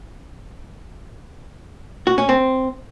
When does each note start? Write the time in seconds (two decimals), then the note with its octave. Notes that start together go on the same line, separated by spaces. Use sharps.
2.07 F#4
2.18 C#4
2.29 C4